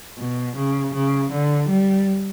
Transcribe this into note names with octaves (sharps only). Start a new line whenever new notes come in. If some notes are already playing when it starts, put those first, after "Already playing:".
B2
C#3
C#3
D3
G3